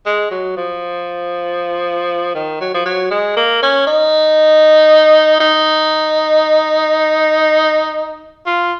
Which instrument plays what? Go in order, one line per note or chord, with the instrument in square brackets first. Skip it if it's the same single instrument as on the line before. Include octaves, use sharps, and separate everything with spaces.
[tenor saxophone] G#3
F#3
F3
D#3
F#3
F3
F#3
G#3
A#3
C#4
D#4
D#4
F4